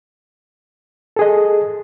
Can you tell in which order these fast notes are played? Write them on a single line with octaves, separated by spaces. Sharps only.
A4 G#4 D#5